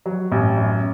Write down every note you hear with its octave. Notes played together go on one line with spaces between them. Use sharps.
F#3
A1
F#2